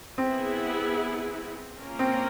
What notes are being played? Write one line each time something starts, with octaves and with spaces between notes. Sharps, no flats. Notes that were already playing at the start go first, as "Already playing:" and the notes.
B3 C4 E4 G#4
A#3 C#4 F4 A#4
C4